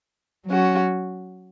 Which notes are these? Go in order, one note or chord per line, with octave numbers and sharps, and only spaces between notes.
F#3 C#4 F#4